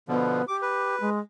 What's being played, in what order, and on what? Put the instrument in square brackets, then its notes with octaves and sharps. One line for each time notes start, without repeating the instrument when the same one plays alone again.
[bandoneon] B2 D3 F3 [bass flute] B3
[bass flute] G4 [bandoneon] D6
[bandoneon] B4
[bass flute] G#3